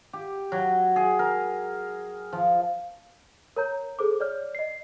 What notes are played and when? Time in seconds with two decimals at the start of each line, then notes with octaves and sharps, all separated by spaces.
0.13 G4
0.52 F#3
0.96 G#4
1.19 A#4
2.33 F3
3.56 A#4 C#5 A#5 G6
3.99 G#4 A4 C5 D6
4.20 C#5 D5 F6
4.55 D#5 C7